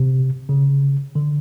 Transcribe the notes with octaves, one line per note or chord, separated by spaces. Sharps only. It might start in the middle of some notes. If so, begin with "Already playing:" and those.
Already playing: C3
C#3
D3